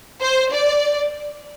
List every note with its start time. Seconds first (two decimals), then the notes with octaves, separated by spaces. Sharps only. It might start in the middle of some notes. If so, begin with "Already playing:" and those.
0.21 C5
0.53 D5